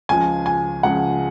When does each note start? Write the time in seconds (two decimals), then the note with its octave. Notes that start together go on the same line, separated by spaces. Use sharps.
0.09 C#2 C#3 F3 G#3 G#5
0.46 G#5
0.83 C#2 C#3 F3 G#3 F#5